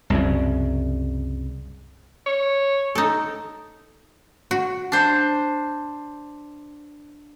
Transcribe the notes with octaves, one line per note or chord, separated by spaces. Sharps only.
C2 F#2 C#3
C#5
D#4 A4
F#4
D4 C5